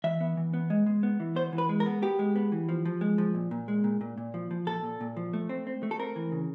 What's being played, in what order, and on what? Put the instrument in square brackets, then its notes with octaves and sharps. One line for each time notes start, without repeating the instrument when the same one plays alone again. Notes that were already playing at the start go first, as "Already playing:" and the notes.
[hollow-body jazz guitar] E3 E5
B3
E3
B3
G#3
G#3
B3
E3
B3 C5
E3
B4
G#3
A#4
B3
B3 G4
G#3
B3
E3
F3
F3
G#3
F3
A#2
A#2
G#3
A#2
A#2
A#2
F3
F3
A#2 A4
A#2
A#2
F3
A3
C4
C4
A3
A4
C4 A#4
E3
C#3